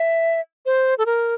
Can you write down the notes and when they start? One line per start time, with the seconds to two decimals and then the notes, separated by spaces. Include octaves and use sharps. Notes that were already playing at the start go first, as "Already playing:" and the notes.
Already playing: E5
0.66 C5
0.98 A4
1.06 A#4